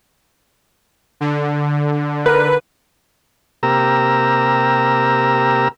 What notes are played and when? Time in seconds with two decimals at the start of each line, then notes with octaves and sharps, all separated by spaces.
1.21 D3
2.26 A#4 B4
3.63 C3 A#3 G4 A#4 A#5 E6